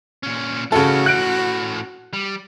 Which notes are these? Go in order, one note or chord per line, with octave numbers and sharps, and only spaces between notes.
A#2 C#4
A2 C#3 C#4 F#4 A4
F#6 D7
G3